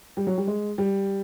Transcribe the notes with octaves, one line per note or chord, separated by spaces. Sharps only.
G3
F#3
G3
G#3
G3